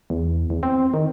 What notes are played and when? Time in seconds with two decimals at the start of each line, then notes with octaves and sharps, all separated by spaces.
0.10 E2
0.50 E2
0.63 C4
0.94 D#3